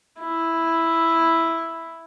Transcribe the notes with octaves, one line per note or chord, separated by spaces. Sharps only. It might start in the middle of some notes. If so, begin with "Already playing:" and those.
E4